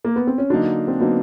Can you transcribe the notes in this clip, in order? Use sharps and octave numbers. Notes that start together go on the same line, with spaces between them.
A#3
B3
C4
C#4
D3 F#3 A#3 D4 D#4
C4
D3 F#3 A#3 B3 D#4